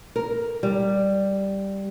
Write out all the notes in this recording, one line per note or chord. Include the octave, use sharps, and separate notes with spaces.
A#4
G3